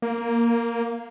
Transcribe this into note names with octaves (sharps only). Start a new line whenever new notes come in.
A#3